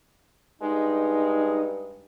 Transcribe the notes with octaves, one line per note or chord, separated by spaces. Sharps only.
G2 G#3 D#4